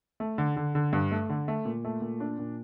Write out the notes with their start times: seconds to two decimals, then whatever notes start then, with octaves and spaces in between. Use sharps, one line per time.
0.20 A3
0.38 D3
0.57 D3
0.75 D3
0.93 G2
1.11 A3
1.30 D3
1.48 A3
1.65 A#2
1.85 A3
2.02 A#2
2.20 D4
2.39 A#2